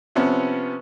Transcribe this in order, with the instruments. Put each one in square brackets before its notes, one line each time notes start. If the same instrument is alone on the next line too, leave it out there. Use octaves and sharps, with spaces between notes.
[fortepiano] C3 F3 B3 C#4